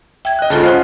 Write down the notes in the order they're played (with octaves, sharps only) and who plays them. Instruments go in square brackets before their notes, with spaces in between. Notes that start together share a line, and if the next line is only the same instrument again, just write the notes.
[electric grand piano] E5 [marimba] G5 G#6
[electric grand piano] D#5 F#6
[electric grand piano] D2 G#2 C#3 [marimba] F4 A4 A5
[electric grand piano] C#4 F4 D#5 [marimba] C5 F#5 F#6